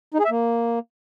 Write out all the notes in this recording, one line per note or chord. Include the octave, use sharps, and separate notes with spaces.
D#4
G#4
E5
A#3